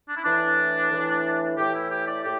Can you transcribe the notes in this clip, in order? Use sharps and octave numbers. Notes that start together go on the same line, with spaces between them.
D4
E4
A2 E3 D4
A2 E3
A2 E3 G4
E4
G4
D5
A2 G4